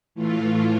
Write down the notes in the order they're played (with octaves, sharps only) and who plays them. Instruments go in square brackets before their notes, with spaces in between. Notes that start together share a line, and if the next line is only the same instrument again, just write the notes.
[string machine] A2 E3 A3 F4